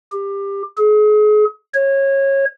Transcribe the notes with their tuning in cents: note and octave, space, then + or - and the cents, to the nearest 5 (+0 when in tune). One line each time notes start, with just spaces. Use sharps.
G4 +20
G#4 +35
C#5 -20